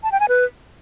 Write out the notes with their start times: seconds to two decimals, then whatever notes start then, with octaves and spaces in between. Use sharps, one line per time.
0.03 A5
0.12 G5
0.20 G#5
0.29 B4